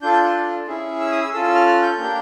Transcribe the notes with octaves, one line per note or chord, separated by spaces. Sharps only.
D4 F4 A4 G6
G6
F#6
C#4 E4 G#4
E6
D#6
E6
C#4 F4 A4 E6
E6
F6
F#6
G6
A#3 D4 G4